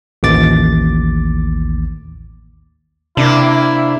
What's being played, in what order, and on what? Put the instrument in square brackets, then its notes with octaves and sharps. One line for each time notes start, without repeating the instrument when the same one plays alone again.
[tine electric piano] A1 D#2 D6 A6
[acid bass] C3 [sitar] A#3 D4 [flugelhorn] E4